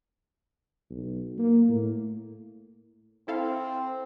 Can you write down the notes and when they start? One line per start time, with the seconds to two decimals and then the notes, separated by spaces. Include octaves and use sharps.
0.90 B1
1.38 A#3
1.68 A2
3.28 C4 E4 A4 F5